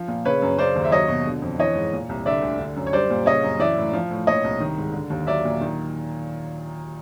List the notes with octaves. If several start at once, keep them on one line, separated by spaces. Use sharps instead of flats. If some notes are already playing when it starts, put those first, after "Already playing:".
Already playing: F3
A#2
C#3 B4 C#5
F#2
C#3 C5 D5
D#2
E5
F#3 C#5 D#5
B2
D3
F2
E3 C#5 D#5
G#2
A#2
C2
D3 D5 E5
D2
D3
F#2
C#5
G3 C5 D5
A#2
C#3 C#5 D#5
F#2
E3 D5 E5
A2
F3
A2
A#2 C#5 D#5
C2
D#3
G#2
D3
D#2
F#3 D5 E5
A#2
D#3